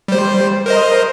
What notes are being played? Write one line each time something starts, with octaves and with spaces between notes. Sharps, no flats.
G3 C5
A#4 C5 D#5